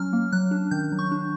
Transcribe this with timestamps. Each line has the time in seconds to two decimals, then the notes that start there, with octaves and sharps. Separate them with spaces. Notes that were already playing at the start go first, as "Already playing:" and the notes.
Already playing: F#3 C#4 F6
0.13 A#3
0.32 F#3 F#6
0.51 D4
0.71 D#3 G6
0.92 F#3
0.99 C#6
1.11 D4